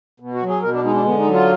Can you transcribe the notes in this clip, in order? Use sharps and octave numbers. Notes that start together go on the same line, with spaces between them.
B2
F#4
F#3
G#4
B2 A#4
D4
G#3 D#4
D4
D3 B3
D#4
F#3
F4